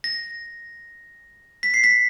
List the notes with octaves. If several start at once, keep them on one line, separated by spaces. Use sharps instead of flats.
A#6
B6
C7
B6